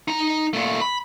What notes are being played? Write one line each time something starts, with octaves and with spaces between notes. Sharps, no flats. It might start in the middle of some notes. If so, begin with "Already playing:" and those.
D#4 A#5
A#2 A3
B5